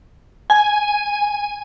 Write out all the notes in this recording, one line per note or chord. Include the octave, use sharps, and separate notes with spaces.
G#5